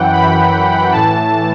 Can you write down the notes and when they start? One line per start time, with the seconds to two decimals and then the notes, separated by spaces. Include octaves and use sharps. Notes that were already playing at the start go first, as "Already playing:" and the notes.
Already playing: F#2 E3 F#5 G5
0.13 B5
0.92 A2 E3 A5